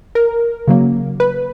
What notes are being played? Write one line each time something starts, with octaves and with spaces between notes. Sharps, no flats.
A#4
C#3 F#3 A#3
B4